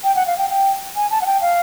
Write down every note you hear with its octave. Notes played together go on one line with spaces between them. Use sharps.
G5
F#5
F5
G5
G5
G#5
A5
F#5
G5
F5